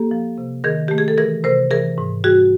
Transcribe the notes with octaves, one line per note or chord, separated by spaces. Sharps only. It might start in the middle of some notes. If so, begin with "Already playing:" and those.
Already playing: A#3 G4 A4
F3
C3
D#3 G#4 A#4
A3 G4
G#4
A4
E3 G#4 A#4
C3 A#4 C5
E3 G#4 A#4
G#2
G3 F#4 G#4